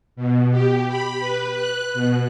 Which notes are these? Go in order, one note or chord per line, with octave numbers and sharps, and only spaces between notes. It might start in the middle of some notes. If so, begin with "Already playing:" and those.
B2
G4
B5
B4
F#6
B2